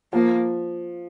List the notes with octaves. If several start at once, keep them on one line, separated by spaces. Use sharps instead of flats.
F3 A#3